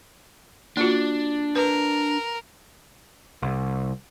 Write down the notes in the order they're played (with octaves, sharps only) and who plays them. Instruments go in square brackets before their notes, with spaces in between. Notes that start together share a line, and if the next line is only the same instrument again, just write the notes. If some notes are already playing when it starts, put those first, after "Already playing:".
[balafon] A#3 F4 F#4 [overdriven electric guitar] D4
[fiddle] A#4 [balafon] B4
[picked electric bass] C2